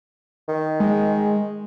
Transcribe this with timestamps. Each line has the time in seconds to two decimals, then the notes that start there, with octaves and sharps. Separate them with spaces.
0.49 D#3
0.80 G#3